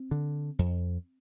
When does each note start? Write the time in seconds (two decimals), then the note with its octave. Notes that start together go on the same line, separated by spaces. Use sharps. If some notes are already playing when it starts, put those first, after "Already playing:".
Already playing: C4
0.11 D3
0.59 F2